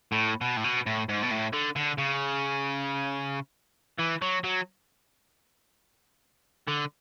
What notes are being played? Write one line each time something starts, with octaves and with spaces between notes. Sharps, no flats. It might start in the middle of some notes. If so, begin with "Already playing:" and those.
A2
B2
A2
B2
A2
G#2
B2
A2
D3
D3
C#3
E3
F#3
F#3
D3